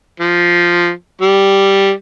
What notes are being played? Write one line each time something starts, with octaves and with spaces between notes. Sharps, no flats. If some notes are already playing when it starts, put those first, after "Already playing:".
F3
G3